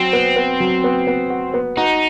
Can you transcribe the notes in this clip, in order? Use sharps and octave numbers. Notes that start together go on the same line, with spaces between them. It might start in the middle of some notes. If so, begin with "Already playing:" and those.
Already playing: F#3 C4
B3
B3
F#3
B3
B3
F#4
B3
D#4 F#4